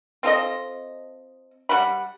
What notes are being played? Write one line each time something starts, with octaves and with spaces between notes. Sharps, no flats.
C4 F4 A4 D#5
G3 F#5 B5